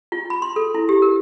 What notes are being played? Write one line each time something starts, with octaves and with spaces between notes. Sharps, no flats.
F4
B5
C6
A4
E4
G4
A#4